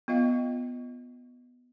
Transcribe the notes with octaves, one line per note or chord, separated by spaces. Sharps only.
B3 F4 D#5 F5 G5